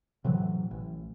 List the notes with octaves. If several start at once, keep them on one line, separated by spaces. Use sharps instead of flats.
A2 C3 E3 F#3
A1